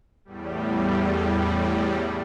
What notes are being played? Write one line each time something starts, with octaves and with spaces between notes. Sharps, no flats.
E2 A2 G3